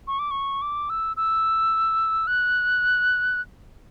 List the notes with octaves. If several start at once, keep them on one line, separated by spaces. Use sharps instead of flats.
C#6
D6
C#6
D6
E6
E6
F#6